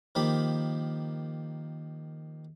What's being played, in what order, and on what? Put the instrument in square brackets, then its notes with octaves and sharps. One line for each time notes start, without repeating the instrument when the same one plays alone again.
[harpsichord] D#3 F3 A#3 G4 B5